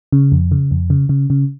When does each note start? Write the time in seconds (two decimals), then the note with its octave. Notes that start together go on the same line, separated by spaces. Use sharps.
0.12 C#3
0.32 F2
0.52 C#3
0.71 F2
0.90 C#3
1.09 C#3
1.30 C#3